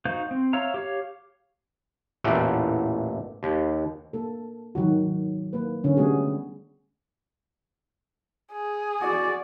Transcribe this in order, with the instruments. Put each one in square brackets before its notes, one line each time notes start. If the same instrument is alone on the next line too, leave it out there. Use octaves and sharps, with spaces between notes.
[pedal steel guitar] D#4 F#4 C5 F5 G6
C4
C#5 E5 F5 A#5
G4 C#5 F5
[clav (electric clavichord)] A1 E2 A#2 A3 F#5 G5
D#2
[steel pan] A#3 A4
D#3 F#3 F#4
A#3 B4
D3 C#4
G3 A3 B3 F#4 G#4
[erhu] G#4
[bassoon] F#4 [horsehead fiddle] D5